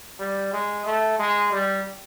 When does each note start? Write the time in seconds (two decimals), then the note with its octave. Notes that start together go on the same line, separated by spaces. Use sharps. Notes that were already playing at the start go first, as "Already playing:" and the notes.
0.20 G3
0.53 G#3
0.86 A3
1.19 G#3
1.52 G3